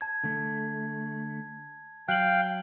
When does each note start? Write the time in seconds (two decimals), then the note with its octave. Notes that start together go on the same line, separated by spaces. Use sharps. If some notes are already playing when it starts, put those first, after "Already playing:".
0.01 A5 G#6
0.24 D3 A3
2.08 F#3 F5 G5 F#6 F#7